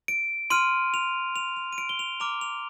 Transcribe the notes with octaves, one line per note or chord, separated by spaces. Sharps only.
D7
C6 F6 D#7
F7
F7
F7
D#7
D7
G7
F7
A#5 D6 F6 F7
F7